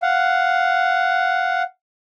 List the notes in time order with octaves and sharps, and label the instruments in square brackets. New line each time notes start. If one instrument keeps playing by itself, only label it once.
[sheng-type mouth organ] F5 F#5